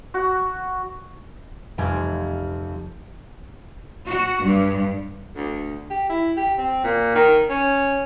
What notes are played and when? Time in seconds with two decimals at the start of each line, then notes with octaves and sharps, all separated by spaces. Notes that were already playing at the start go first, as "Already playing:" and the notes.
0.14 F#4
1.78 F1 F2 G3 G#5
4.08 F#4
4.43 G2
5.37 D2
5.90 G4
6.09 E4
6.37 G4
6.58 C4
6.84 A#2
7.15 D#3
7.49 C#4